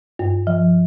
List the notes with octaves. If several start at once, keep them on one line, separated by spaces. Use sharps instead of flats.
G2
F3